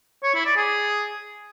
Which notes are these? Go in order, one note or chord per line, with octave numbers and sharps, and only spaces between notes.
C#5
E4
D5
G#4